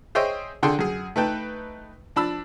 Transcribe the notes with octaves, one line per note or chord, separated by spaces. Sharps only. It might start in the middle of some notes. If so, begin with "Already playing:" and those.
G#4 C5 C#5 D#5 E5 G5
D3 D4 G#4 A4 G5 C6
F#2 G#4
A3 D#4 B4 G5 A5
F3 D4 A5 B5 E6